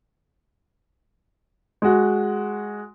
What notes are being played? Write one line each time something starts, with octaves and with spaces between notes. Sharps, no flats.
G#3 F#4